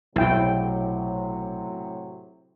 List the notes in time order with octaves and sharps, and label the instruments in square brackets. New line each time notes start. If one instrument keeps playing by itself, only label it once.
[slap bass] B1 [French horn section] A2 C3 F#3 [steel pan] E4 G5